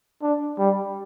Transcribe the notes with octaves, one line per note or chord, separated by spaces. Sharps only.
D4
G3